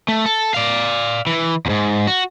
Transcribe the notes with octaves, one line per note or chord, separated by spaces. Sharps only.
A3
A4
D5 F5
E3
E2 G#2
F#4